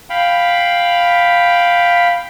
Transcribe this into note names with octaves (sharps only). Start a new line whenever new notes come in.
F5 G5 B5